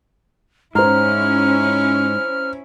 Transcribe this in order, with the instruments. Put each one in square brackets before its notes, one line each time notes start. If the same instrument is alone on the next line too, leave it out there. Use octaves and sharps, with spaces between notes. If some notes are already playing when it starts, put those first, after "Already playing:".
[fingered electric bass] G#2 [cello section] C#4 E4 [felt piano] C5 A#5 [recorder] F6